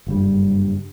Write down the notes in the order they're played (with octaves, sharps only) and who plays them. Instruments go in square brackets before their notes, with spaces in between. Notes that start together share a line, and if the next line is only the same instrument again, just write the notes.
[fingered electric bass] F#1 G2 G3